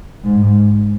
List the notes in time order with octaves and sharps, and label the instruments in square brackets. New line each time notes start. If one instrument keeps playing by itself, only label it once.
[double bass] G#2